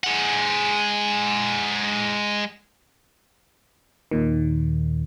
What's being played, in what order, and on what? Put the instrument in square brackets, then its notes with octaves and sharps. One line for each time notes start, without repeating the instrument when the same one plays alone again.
[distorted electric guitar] G#3 F#5
[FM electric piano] D#2 A#2 D#3